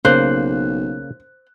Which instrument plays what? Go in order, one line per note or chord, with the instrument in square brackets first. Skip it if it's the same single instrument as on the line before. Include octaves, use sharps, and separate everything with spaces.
[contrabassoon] B1 [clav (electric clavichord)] C#3 A#3 [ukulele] C5 [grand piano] F#6